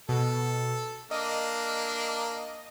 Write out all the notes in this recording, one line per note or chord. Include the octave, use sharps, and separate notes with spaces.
B2 A4
A#3 D4 D#5